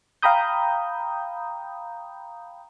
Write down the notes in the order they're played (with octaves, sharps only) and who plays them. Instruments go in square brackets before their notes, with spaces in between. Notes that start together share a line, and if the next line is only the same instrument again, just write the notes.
[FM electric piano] F5 G5 A#5 B5 D#6 G6